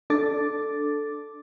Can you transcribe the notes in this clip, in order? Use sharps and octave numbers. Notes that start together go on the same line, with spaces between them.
D4 A4 D6 A6